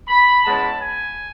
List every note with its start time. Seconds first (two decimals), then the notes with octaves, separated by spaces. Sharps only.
0.08 B5
0.44 B2 G#3 C#4 E4 A5
0.81 G#5